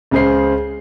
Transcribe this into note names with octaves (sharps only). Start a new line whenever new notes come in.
C#2 C#3 G#4 C5 C7